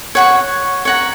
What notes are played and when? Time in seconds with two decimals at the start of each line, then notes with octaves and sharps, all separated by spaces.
0.15 C#5 F#5 C#6
0.85 C#5 F#5 A#5